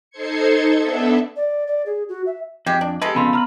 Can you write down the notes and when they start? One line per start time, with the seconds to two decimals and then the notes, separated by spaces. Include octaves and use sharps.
0.11 D#4 A4 C5 C6 G#6 C#7
0.79 B3 D4 A4 E5
1.36 D5
1.67 D5
1.86 G#4
2.09 F#4
2.26 E5
2.66 F2 G#3 G4
2.81 D4
3.02 G#3 G4 A4 B4
3.15 F2 C#3 B3 F4 B5 C6
3.33 F4 B4 A#5 F6